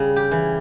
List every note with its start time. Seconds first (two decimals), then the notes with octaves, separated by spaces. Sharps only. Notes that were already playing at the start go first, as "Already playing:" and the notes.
Already playing: C#3 G3
0.16 G4
0.31 E3